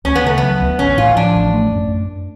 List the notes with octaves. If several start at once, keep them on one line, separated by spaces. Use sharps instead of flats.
D2 C#4
B3
C#3 A3
F#3 B3
D2
A1 C#4
A2 F4
F3 D4
A1
A3
F#2